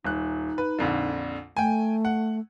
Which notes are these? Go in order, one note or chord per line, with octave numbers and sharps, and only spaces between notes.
D#1 D#4 F#6
B4
A#1 F2 D3
A3 G5 G#5
F#5